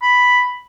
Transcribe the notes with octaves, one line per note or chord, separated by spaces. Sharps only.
B5